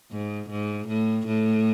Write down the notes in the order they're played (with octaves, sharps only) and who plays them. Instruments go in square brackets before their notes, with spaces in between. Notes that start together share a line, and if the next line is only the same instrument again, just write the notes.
[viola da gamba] G#2
G#2
A2
A2